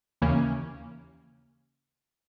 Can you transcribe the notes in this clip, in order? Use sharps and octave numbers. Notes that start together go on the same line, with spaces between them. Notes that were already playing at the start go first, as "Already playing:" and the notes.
D#2 C#3 E3 A#3 C#4